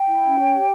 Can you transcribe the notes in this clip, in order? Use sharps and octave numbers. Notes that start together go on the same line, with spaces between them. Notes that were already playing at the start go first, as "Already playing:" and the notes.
Already playing: G5
E4
C#4
C#5
G4